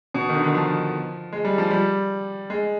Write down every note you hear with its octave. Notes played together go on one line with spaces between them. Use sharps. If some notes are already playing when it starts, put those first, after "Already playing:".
B2
D#3
D3
D#3
F3
G#3
G3
F3
G3
G#3